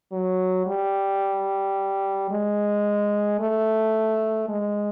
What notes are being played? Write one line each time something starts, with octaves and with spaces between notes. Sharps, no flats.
F#3
G3
G#3
A3
G#3